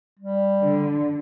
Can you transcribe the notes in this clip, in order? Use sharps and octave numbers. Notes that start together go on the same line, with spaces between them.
G3
D3